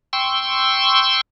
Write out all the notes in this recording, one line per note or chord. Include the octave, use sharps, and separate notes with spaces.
G5 C6 C#6 E6